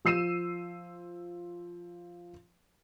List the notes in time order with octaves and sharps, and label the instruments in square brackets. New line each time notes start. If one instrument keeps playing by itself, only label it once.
[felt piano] F3 E6 C7 D#7 E7